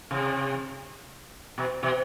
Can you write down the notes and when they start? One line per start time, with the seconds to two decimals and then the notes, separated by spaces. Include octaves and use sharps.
0.11 C3
1.58 B2
1.83 B2